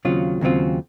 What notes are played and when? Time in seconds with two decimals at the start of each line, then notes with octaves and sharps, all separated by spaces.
0.05 D#2 C#3 F#3 C4 F4
0.41 D#2 C#3 F#3 C4 F4